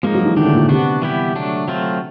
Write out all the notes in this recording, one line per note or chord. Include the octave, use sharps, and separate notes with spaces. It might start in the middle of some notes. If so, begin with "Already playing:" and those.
F3 G#3 A#3 D#4
F#3
E3
D#3 F#3 A3 D4 G4
D3
A#2
C3 B3 D4 F#4
E3 G3 B3 E4 G4
F#3 A3 D4
F#3 A3 C4 F4